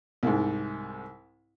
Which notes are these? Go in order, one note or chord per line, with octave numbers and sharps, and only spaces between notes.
C2 G#2